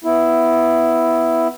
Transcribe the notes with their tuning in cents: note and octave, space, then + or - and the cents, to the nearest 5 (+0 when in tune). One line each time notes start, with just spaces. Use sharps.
B3 +5 E4 +0